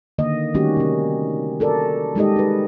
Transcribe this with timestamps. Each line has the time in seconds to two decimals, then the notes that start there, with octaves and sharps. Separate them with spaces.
0.18 D3 D#3 A#3 D#5
0.54 D#3 G3 A3 C#4 F#4 G4
0.77 C3 C#4
1.60 F#4 A4 A#4 D5
2.15 G3 G#3 D#4 G4 A4 D#5
2.36 D#4 B4